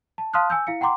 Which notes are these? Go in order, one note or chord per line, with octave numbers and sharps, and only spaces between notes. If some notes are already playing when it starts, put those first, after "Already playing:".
A5
F5 A5 C6 D#6 F6 F#6
G#5 E6 G6
E4 F5 C#7
F#5 G5 A#5 C6 D6